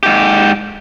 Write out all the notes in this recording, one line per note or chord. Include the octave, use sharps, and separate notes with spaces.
G#2 G4